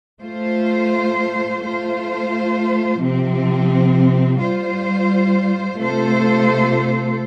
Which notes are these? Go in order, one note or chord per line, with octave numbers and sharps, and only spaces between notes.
A3 F4 C5
A3 F4 C5
C3 F3 C4
G3 F4 C5
C3 A3 F4 A4 C5